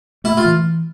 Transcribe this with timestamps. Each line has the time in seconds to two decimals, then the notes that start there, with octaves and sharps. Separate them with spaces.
0.24 A3 E4
0.37 F4
0.45 E3